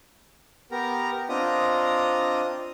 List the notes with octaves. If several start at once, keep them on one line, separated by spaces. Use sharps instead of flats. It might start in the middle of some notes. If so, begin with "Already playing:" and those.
B3 G4 A#4 A#5
C4 D4 F4 D#5 A#5 D#6